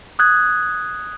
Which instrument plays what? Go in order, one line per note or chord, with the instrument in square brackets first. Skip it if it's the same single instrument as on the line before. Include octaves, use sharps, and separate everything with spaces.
[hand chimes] D#6 F#6 G#6